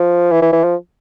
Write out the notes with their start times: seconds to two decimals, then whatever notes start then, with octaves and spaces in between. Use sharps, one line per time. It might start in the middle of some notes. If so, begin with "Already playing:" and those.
Already playing: F3
0.32 E3
0.42 E3
0.53 E3
0.64 F3